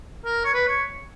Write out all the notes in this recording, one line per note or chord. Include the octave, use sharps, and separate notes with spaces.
A#4
C#5
B4
C#5